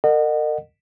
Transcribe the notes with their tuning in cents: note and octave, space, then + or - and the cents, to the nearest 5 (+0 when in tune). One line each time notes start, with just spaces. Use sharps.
A#4 -35 D#5 -35 F#5 +0